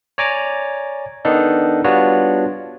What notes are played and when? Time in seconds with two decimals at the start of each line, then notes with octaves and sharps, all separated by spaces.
0.18 C#5 D5 G#5 A#5 D6
1.25 D#3 B3 D4 D#4 A4
1.84 G3 B3 D4 F4 F#4 C#5